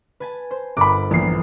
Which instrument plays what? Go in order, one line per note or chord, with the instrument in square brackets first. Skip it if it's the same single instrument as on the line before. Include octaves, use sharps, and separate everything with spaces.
[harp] B4 G#5 A5
C5 C6
[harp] G1 A#4 F#6 [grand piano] B5 D6
[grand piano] A#1 C7 [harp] E3 A#3 B3